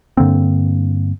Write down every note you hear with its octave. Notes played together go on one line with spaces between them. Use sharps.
G2 D3 A#3 C4